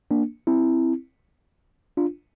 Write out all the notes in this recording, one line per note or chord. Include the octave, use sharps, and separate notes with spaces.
A#3 D4
C4 E4
D4 F4